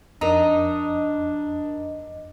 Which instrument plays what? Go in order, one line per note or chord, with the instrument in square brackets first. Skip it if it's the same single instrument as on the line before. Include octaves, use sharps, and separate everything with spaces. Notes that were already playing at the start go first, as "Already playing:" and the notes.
[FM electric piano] F2 D#5 [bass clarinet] D4 [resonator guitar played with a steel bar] D#4 [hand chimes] A#4 A#5